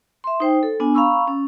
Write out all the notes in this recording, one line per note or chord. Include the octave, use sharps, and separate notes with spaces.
E5 C6
D#4 C5 G5
A4
B3 D4 G#5
F5 A#5 B5 C#6 E6
C#4